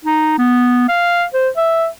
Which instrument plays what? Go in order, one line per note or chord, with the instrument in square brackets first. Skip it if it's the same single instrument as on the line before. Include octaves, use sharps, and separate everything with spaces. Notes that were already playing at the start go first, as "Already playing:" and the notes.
[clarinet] D#4
B3
F5
C5
E5